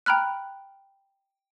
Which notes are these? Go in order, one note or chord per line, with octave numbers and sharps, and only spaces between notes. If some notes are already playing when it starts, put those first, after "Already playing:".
G5 A#5 B5 F6 F#6